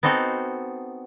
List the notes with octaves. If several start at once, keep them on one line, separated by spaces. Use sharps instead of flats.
B3 C4 D#4 F#4 A4